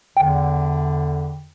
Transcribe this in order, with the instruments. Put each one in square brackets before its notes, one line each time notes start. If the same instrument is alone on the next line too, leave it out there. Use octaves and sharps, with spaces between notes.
[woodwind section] E2 D3 [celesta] G5